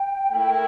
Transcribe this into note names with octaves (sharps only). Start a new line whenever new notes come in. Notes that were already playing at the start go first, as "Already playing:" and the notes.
Already playing: G5
A3 E4 A#4